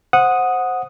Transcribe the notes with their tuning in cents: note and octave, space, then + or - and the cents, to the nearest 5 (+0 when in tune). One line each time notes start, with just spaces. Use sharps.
C5 +0 F#5 -10 D#6 +0